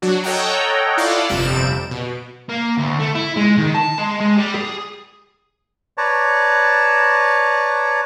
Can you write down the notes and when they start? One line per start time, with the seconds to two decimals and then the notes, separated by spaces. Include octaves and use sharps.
0.02 F#3 D4 F#4
0.24 A4 C#5 D#5 F#5 G5 A#5
0.97 E4 F4 A4 D5 F5 F#5
1.29 G1 F2 C3 G3 D7 E7
1.91 B2
2.50 A#3
2.79 D2
3.00 A3
3.15 E4
3.37 G#3
3.58 D#3
3.75 A5
3.98 G#3
4.20 G#3
4.37 G3
4.55 G#4
5.98 B4 C#5 D5 A5 A#5